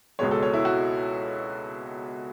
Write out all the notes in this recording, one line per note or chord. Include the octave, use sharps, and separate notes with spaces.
C#2 B2 G#3 C#5
A4
C#5
E4
F#4